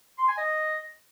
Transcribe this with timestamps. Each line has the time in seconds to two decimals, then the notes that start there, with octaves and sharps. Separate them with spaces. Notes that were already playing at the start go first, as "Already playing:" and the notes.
0.19 C6
0.28 G#5
0.38 D#5